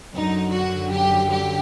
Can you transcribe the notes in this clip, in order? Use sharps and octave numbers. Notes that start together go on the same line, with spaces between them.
F#2 D3 F#3 D#4
F#4
G4
G4